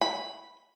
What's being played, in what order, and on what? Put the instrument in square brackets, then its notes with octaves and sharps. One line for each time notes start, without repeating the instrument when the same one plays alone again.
[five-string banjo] B5